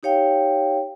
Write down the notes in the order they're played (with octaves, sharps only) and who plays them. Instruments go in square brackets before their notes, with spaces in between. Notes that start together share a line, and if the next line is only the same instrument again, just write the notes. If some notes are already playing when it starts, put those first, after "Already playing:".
[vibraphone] D#4 G4 C#5 F5 G5